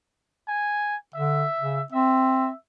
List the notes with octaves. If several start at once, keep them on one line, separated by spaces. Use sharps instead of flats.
G#5
D3 E5
C#3
C4 E5